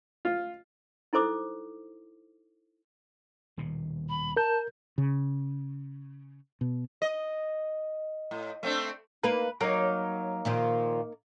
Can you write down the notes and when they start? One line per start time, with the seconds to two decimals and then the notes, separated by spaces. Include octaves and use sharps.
0.25 F4
1.13 D#4 E4 A4 C5 D6 D#6
3.57 D#1 D#2 B2
4.09 B5
4.37 A#4 A5 G6
4.98 C#3
6.61 B2
7.02 D#5
8.31 A2
8.63 A3 C4 D4
9.24 A#3 D#4 B4
9.61 F#3 A#3 D#4
10.45 A#2 D#3 F3